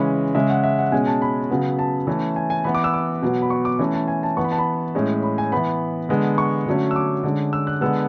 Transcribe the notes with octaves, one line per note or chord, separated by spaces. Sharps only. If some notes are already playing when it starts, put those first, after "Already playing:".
Already playing: C#3 E3 G#3 C#4 B5
C#3 G#3 C#4 E5
F#5
E5
F#5
B2 G#3 C#4 G#5
A5
B5
C#3 F#3 B3
A5
E3 A3 C#4
G#5
G#5
E3 B3 B5
D6
E6
D6
B2 F#3 B3
B5
C#6
D6
E3 A3 C#4
A5
G#5
A5
E3 B3 C#6
B5
A5
B5
A2 G#3 C#4
B5
G#5
E3 B3 B5
D3 G#3 B3
C#6
D3 F#3 A3 C#4
E6
D6
D3 G#3 C#4
E6
F#6
D3 G#3 B3 E6